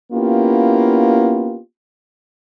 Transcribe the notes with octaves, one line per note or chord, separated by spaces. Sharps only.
A#3 B3 C#4 E4 F4 G4